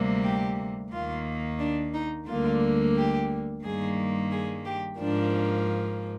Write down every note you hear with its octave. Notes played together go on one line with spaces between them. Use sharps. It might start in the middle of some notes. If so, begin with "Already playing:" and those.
Already playing: D2 C3 G3 A#3
G4
D#2 D#3 A#3 F4
D4
D#4
D2 D3 G3 A#3 F4
G4
G2 D#3 G3 A#3 G#4
G#4
G4
G#2 F3 A#3 D4